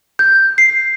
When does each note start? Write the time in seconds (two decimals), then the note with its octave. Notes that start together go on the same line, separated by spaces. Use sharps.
0.19 G6
0.58 C7